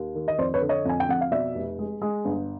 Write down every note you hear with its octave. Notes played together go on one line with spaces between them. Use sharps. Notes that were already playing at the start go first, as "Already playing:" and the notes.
Already playing: D#2
D#3
D#5
F2 C5 D5
B4 C#5
D3
C#5 D#5
F2 G#5
G5
F2 F#5
F5
B2 D5 E5
F1
G#3
G#3
G1